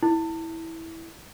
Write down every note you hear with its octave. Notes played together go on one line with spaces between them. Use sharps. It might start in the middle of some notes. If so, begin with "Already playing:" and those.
E4